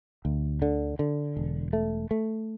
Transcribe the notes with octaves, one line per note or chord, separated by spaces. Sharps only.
D2
D3
D3
E1
A3
A3